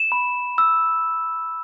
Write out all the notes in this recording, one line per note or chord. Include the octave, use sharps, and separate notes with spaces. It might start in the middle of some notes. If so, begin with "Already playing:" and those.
Already playing: E7
B5
E6